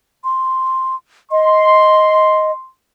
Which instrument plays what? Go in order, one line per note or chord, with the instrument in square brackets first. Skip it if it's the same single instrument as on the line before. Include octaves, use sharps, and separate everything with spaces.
[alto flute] C6
[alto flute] D#5 [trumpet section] C6